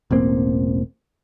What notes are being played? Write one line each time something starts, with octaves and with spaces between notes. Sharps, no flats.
E1 A1 A#3 C4